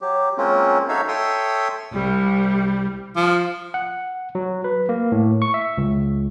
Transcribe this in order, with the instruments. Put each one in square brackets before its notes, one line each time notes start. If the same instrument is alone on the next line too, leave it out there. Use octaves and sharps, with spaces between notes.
[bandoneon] F#3 G4
F#3 G#3 A#3 C4 C#4 F4
D#4 F#4 A4 C#5 E5 F5
A4 C#5 E5 G5 C6 D#6
[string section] C2 [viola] G3
[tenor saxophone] F3
[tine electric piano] F#5
F#3
B4
A#3
A2
C#6
E5
C#2